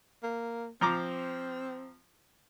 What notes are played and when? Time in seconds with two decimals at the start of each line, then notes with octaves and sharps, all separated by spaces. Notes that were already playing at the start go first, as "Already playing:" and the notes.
0.23 A#3
0.81 F3 C4 A#5 D6